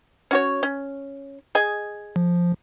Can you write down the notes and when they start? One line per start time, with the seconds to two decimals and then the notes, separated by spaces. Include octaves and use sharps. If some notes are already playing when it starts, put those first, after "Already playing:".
0.31 C#4 F#4 C#5
0.63 C#4
1.55 G#4 D#5 G#5
2.16 F3